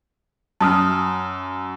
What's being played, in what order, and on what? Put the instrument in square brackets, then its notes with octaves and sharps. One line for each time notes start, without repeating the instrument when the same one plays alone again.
[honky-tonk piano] F#2 [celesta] A5 D#6 F6